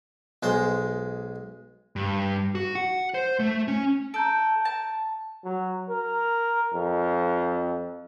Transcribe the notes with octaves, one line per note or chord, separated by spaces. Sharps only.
B1 G#3 C5
G2
F#4
F#5
C5
A3
C#4
A4 A#5 G6 D7
A5
F#3
A#4
F2